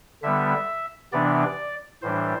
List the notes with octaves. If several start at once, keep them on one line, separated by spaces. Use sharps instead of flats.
D3 G3 B3 E5
C3 E3 B3 D4 D5
A2 E3 G3 D4 C5